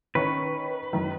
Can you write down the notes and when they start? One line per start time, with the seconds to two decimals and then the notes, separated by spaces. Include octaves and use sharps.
0.15 D#3 C#4 B4 C#6
0.93 F#2 D#3